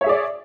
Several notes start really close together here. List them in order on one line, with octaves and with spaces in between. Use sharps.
C#5 E5 G#4 D5